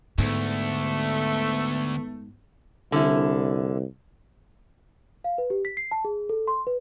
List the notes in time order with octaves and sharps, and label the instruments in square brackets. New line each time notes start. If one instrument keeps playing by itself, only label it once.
[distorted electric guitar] D2 [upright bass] G#2 [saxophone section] A3 [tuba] B3
[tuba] C2 [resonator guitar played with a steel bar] D3 C#4 E4
[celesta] F5
B4
G4
B6
C7
A5
G#4
A4
C6
B4